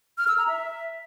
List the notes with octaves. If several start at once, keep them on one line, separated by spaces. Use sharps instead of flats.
F6
E6
A#5
E5